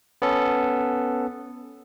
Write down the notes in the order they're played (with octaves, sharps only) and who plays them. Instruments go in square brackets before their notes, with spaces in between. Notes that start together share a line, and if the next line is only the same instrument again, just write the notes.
[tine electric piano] B3 C#4 A4